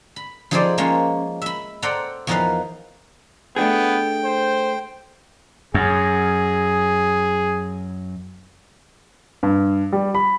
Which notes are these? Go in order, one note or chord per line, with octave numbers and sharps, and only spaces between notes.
B5
F3 D#4 G#4 A4 C5 D5
F3 G#3 A#3 C#4 F4
E5 B5
A4 C5 D5 F#5 G5 A#5
E2 F3 D#4 A#4 B4 F5
A3 B3 D4 G#4 G5
C5
F#2 G#4
G2
G3
B5